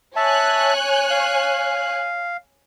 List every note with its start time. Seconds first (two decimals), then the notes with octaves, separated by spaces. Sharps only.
0.16 C#5 E5 G#5 A5 F#6
1.11 F5